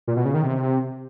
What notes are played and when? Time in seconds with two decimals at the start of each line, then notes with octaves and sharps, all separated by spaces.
0.08 A#2
0.16 B2
0.25 C#3
0.34 D#3
0.43 C3